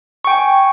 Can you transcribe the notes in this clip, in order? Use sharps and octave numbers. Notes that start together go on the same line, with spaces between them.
G5 G#5 C#6